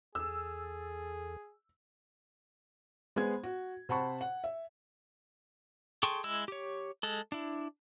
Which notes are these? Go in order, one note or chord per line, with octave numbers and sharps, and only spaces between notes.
E2 G#4 A4 E6
G#3 B3 G#4 C5 G#6
F#4
C3 C5 F#5 A5 B5 C#6
F#5
E5
G#4 A4 G5 C6 C#6
G#3 E4 E6
G4 C#5
G#3 A4
D4 E4